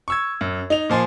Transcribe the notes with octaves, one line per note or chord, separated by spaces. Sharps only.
C#6 E6 G#6
F#2
D#4 F7
A#2 F3 G#5 C6